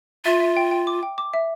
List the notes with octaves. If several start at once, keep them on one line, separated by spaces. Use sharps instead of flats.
F4 E5
E5
G5
G5
D6
G5
D6
E5